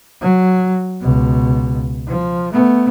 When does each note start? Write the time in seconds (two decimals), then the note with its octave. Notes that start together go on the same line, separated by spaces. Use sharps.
0.21 F#3
1.01 C#2 B2
2.08 F3
2.53 A3 B3